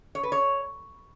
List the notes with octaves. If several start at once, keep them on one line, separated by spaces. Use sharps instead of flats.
C#5
B4
C#5